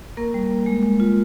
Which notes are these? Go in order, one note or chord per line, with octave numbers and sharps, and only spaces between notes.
A#3 A#4
G3
A#3
G#3
G#3
F4